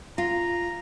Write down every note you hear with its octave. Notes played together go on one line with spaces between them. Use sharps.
F4 A#5